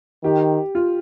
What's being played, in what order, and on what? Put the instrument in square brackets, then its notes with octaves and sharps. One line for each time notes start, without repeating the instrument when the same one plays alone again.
[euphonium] D#3 [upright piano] G4
[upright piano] F4